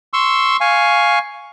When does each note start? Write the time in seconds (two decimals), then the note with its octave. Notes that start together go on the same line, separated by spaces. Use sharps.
0.13 C6 C#6 E6
0.61 F5 G#5 C#6